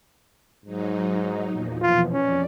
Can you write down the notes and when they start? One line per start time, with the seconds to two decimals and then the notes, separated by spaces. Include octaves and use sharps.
0.66 G#2 F#3 D#4
1.51 E2 A#2 F3
1.81 B2 E3 F3 F4
2.13 F2 C#4 D5